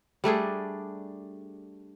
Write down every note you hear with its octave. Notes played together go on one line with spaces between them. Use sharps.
G3 A3 D4 G#4